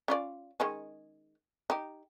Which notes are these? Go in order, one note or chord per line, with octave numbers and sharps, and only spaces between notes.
C#4 F4 D5
D#3 G#3 C#4
D#4 G4